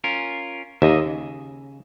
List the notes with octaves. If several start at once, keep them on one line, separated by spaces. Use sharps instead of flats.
C#4 F4 A#4
D#2 A#3 D#5 E5
C#3